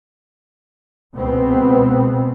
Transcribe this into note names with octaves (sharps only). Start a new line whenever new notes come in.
C#2 B2 B3 C4